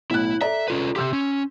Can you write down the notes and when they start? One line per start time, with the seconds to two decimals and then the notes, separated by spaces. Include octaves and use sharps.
0.11 B1 A2 E4 F#6
0.41 A4 D5 E5 A#5
0.68 C#4 F4 B4
0.96 C3 D#3 G4 C6 E6 G6
1.13 C#4